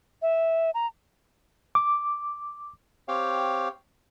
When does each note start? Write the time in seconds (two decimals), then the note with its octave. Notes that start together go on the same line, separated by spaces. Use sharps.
0.22 E5
0.74 A#5
1.75 D6
3.08 C4 G4 C#5 F5 G5